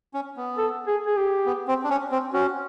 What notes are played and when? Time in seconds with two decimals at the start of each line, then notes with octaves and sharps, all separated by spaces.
0.14 C#4
0.37 B3
0.58 A4
0.87 G#4
1.06 G#4
1.17 G4
1.46 B3
1.67 C4
1.84 D4
1.90 C#4
2.12 C4
2.33 C#4 F#4